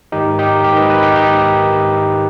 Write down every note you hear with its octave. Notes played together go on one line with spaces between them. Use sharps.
G#2 D#3 D#4 G4
D#4 G4
G#2 D#3 G4 A#4
B4 D#5
B4 D#5
D#4 G4
G#2 D#3 D#4 G4
G#2 D#3